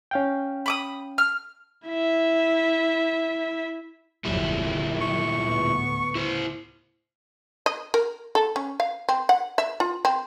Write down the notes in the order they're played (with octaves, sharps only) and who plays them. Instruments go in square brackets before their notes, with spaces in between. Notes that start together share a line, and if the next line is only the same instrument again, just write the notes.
[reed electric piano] C#4 F5 G5
[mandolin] B5 D6 D#6
F6
[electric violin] E4 E5
[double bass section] F1 D2 F#3 [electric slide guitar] A#2 G3 E4
[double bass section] D#3 F#3
[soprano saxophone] C#6
[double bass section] D2 A2 B3
[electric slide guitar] E4 C5
[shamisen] D#5
A#4
A4
C#4
F5
C4
F#5
E5
F4
C4